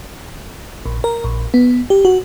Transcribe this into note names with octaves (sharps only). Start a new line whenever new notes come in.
A#1
A#4
A#1
B3
G4
F#4